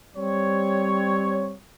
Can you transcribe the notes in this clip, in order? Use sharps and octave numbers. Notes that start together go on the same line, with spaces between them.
G3 C4 C#5